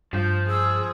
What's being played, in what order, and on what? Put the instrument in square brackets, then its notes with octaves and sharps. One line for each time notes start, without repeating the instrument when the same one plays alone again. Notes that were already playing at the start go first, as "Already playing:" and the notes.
[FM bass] G2 [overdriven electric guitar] F3 [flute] G6
[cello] G#4 [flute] E6